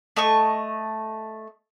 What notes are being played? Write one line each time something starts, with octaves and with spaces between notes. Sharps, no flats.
A3 D#5 C#6